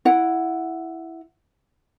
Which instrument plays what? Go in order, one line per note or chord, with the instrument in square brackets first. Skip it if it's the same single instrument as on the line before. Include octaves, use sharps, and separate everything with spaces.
[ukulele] E4 F#5